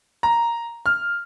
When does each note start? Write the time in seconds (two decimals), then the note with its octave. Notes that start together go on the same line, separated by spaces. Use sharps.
0.23 A#5
0.86 F6